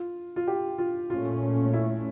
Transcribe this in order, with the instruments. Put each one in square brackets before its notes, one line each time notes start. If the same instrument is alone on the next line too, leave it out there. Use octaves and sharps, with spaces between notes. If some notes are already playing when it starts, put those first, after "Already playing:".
Already playing: [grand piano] F4
F4
G4
F4
[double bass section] A#2 A3 C#4 [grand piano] F4
[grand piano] E4